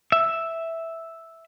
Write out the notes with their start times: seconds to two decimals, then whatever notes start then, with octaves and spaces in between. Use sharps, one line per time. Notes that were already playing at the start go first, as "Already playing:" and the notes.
0.12 E5